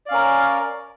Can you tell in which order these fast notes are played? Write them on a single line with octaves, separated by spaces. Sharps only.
D5 F5 C#4 A#4